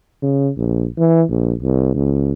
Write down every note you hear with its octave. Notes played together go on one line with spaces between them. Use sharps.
C#3
A#1
E3
A#1
C2
C#2